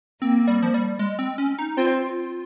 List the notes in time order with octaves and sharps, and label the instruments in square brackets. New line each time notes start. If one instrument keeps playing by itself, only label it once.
[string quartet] A#3 [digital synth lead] C4
[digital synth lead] G3
F3
G3
G#3
C4
C#4
D#4
[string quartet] C4 [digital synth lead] F4